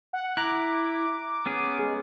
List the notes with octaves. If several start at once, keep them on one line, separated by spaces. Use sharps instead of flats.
F#5
E4 A#5 D6 F#6
B3 C#4 G#4
G#3